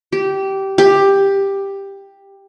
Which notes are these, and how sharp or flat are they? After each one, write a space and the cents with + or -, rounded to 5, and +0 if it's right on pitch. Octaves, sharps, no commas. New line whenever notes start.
G4 -15
G4 +10